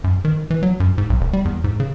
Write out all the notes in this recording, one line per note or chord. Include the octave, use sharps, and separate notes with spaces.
F#2
D#3
E3
F#3
F#2
G#2
B1
E1
G3
E2
G#2
C#3